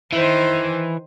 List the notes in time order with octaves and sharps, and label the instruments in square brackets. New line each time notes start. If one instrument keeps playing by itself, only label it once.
[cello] D#3 C5 [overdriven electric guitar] E3